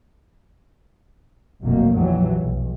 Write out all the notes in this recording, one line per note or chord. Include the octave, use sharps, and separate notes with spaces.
F1 C2 F#2 B2 A#3
A#1 F2 E3 F#3 G3
B1